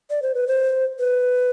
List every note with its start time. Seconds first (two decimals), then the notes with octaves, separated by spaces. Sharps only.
0.10 D5
0.22 C5
0.35 B4
0.48 C5
0.99 B4